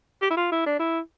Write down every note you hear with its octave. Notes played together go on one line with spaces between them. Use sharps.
G4
E4
F4
E4
D4
E4